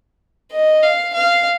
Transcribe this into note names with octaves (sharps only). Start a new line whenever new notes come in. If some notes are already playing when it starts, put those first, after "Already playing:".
D#5
F5
F5